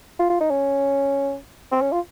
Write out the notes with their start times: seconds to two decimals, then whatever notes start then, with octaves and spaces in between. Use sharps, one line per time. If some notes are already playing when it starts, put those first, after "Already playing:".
0.19 F4
0.30 F4
0.41 D#4
0.50 C#4
1.72 C4
1.81 C#4
1.92 F4